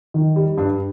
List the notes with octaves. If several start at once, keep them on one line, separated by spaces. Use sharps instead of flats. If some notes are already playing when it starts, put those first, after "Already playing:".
D#3
G3
G2 D4